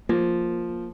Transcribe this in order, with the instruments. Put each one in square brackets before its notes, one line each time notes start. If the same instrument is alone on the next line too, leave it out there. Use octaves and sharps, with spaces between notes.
[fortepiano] F3 [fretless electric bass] A#3